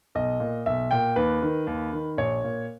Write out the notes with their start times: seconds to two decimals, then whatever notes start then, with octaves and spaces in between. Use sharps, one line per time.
0.15 B1 D#5
0.40 A#2
0.66 B1 E5
0.91 A#2 G5
1.16 D#2 B4
1.43 D#3
1.67 D#2
1.93 D#3
2.18 A#1 C#5
2.44 A#2